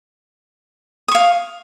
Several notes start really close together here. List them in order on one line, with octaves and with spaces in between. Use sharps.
D#6 C#6 F5